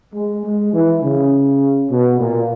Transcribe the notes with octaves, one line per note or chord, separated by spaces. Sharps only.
G#3
G#3
E3
C#3
B2
A#2